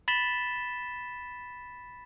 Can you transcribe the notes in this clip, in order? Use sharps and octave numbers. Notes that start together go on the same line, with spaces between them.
B5 A6 B6 E7 G7